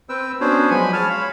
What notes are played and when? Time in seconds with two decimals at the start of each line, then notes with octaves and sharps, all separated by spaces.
0.09 C4 B4 G5 E6
0.41 B3 C#4 D4 F#4 C5 C#5
0.70 F3 F#3 G#3 G#5 B5
0.93 C#5 A5 F6
1.09 C#5 F5 B5